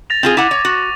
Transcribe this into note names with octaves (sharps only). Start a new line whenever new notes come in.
A6 A#6 F7
C4 F4 G#4
E4 F#5 D6 D#7
C#5
F#4